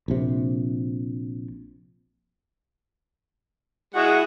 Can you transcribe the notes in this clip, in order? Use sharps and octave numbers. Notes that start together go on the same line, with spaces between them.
A#1 C3
G#3 E4 F#4 E5 F#5